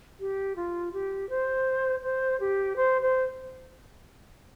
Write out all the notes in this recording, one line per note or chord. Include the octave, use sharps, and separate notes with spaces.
G4
F4
G4
C5
C5
G4
C5
C5